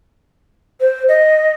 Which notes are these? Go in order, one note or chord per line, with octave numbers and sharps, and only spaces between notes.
C5
D#5